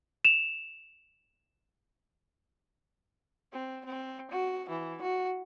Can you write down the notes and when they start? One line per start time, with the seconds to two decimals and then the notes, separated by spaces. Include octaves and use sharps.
0.25 E7 F7
3.52 C4
3.85 C4
4.31 F#4
4.69 E3
5.02 F#4